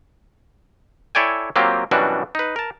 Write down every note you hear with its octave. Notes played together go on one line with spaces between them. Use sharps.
E4 A4 C#5 D5 G5 G#5
F#3 A#3 C4 F4 G4
F#2 B2 E3 G3 D4 F#4
D#4 B4
A#4 A5